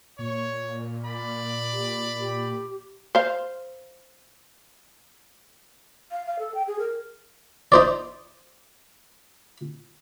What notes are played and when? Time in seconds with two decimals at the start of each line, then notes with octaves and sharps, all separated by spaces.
0.19 A#2 C#5
1.04 D5 B5
1.73 G4
2.19 G4
3.15 C5 F5
6.12 F5
6.26 F5
6.39 A4
6.55 G5
6.67 G#4
6.79 A#4
7.72 D#4 C5 D5